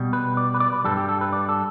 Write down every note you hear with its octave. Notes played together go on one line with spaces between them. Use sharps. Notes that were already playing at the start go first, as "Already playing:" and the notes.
Already playing: B2 G3
B4
D5
B4
D5
B4
G2 G3 A4
G4
A4
B4
D5
A4